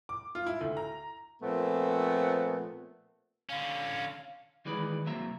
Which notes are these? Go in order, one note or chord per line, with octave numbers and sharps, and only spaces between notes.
D6
F4
E4
D2
A#5
A#2 F3 A3 B3 C4
D3 C#4 F5
D#3 E3 G#3 D#4 B4 D5
C2 F#3 A#3 C4 E5 A#5